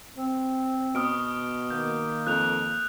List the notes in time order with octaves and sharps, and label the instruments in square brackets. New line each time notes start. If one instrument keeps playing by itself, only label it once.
[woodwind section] C4
[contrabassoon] B2 [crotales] D#6 F6 D7
[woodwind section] D#3 A#3 [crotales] G6
[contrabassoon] F2 [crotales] F#6 F7